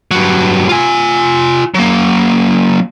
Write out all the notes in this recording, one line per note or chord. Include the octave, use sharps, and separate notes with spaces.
G2 F#3
F4 G#5
F#3 A#3